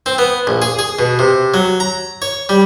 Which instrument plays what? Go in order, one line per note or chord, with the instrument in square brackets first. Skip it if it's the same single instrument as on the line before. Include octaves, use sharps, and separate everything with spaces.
[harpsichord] C4
B3
A#1
G#4
G#4
B2
C3
F#3
A#5
C#5
G3